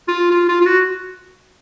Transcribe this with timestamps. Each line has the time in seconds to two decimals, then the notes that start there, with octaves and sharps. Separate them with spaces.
0.08 F4
0.31 F4
0.49 F4
0.61 F4
0.66 F#4